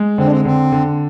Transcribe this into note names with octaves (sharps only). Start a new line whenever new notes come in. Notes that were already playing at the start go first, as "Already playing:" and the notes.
Already playing: G#3
D3 C4
D4
C4
D3 C4
D3